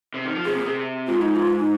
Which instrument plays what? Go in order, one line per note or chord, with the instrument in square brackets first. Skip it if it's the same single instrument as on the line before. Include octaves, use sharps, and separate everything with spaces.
[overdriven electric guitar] C3
D#3
F3
[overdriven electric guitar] C3 [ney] G#4
[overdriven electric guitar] A#2
C3
[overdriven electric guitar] G#2 [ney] F4
[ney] D#4
F4
D#4